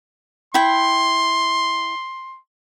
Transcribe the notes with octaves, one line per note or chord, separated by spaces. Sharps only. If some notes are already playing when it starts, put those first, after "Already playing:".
E4 G5 C6